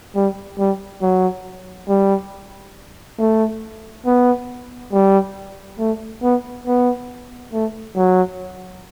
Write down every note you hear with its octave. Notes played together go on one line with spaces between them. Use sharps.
G3
G3
F#3
G3
A3
B3
G3
A3
B3
B3
A3
F#3